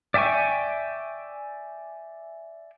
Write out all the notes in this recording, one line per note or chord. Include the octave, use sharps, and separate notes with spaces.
D5 E5 G5 G#5 C#6